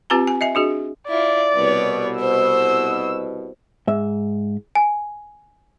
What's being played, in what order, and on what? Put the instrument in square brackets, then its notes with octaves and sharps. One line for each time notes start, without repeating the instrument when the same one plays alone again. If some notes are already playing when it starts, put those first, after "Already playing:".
[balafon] C4 F4 G4 B4 G#5 A#5
G#5
D#5 E5 G#5
D4 F#4 G#4 D#5
[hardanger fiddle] E4 F4 [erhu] D5
[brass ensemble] C2 B2 [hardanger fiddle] B4 C#5
[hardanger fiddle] C5 [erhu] E6
[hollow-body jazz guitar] G#2 E5
[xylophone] G#5